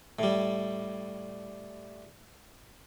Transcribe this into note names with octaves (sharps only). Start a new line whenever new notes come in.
A2 G3